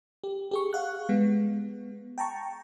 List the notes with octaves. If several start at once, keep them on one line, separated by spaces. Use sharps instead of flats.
G4
G4 G#4 C#6
F5 F#5 F#6
G#3 B3
G5 A5 A#5 C#6